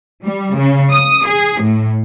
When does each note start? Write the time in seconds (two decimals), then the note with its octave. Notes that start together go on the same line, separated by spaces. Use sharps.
0.24 G3
0.56 C#3
0.92 D#6
1.27 G#4
1.61 A2